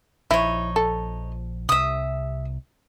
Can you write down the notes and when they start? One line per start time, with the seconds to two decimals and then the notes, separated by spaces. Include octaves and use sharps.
0.31 A#1 F3 D#4 E4 C#5
0.76 A4
1.69 C2 C3 E5 D#6